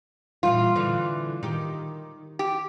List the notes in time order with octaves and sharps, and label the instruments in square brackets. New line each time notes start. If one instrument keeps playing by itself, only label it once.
[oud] A#2 E3 G3 [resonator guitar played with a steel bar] F4
[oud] D3 E3
D#3 G4
[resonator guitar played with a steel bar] G4